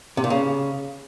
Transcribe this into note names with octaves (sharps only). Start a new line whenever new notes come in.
C3
A#2
C#3